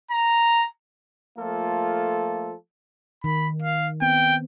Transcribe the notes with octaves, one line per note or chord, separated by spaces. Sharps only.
A#5
F3 A3 A#3 F4 A4
D#3 B5
F5
B3 C4 G5